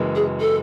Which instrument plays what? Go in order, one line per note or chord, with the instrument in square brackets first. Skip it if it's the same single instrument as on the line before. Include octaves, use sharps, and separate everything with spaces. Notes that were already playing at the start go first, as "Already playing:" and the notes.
Already playing: [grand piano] F#1 F#2 E3 G#3
[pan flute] G#4
A4